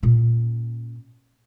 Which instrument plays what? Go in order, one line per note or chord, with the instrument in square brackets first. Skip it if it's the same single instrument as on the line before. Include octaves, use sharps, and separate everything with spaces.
[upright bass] A#2 C#4